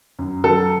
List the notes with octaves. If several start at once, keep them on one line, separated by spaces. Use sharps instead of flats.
F#2
F#3 A4